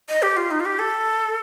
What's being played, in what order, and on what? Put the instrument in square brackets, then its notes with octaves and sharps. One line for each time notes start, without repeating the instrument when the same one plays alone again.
[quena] D#5
G4
F4
D#4
F4
G4
A4